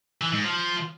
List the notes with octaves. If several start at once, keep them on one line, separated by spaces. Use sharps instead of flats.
E3
G#2
F3